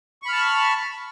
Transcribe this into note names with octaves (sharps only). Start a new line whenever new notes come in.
A5 B5 C#6 F6